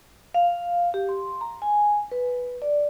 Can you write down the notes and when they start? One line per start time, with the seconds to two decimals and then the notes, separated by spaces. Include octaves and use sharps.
0.34 F5
0.94 G4
1.09 C6
1.41 A#5
1.62 G#5
2.11 B4
2.62 D5